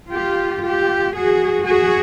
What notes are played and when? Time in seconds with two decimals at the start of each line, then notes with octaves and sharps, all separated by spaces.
0.11 F4 G4
0.63 F4 G4
1.15 F#4 G#4
1.66 F#4 G#4